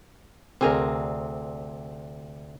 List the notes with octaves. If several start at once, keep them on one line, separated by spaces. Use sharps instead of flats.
D2 C3 C4 G#4 A#4